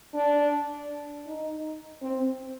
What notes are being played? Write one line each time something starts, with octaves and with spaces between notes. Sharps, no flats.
D4
D#4
C4